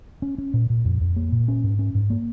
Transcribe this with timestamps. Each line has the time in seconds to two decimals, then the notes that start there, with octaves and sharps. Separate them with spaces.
0.22 C#4
0.38 C#4
0.54 A#2
0.70 A#2
0.85 F2
1.01 F2
1.16 A#3
1.32 A#2
1.48 C#4
1.64 G#2
1.79 C#4
1.95 G#2
2.10 A#3